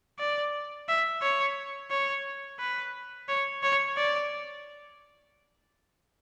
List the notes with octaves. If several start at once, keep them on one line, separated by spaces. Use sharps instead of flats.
D5
E5
C#5
C#5
B4
C#5
C#5
D5